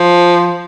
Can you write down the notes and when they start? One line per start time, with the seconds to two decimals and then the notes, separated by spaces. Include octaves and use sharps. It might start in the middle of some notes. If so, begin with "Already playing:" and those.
Already playing: F3